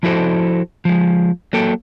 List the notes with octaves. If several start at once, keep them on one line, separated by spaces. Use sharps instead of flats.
F3 E4 F#4 A4 C5
F3 G#3
F#3 A#3 A4 G5